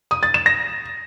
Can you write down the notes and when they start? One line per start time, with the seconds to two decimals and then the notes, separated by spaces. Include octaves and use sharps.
0.11 D#6
0.23 A6
0.34 E7
0.46 A#6